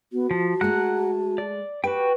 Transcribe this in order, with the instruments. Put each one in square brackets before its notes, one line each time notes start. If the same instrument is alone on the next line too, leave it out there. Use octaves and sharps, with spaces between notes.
[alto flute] B3 [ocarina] F#4
[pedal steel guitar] F3 [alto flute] A5
[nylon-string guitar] G#3 A3 [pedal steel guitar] F#5 A#5 F#6
[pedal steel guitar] D5
[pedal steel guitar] F#4 G5 [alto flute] G4 [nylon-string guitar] B4